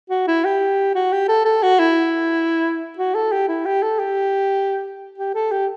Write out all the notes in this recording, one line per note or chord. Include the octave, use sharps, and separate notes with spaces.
F#4
E4
G4
F#4
G4
A4
A4
F#4
E4
F#4
A4
G4
E4
G4
A4
G4
G4
A4
G4